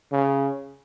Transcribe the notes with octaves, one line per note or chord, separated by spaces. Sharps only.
C#3